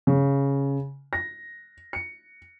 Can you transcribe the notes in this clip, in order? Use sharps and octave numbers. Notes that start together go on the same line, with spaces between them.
C#3
A#6
C#7